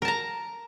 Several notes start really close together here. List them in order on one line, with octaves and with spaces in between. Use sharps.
A#4 A5 A#5